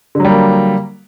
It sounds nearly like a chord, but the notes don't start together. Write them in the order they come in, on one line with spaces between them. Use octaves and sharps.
D3 F#3 G3 A#3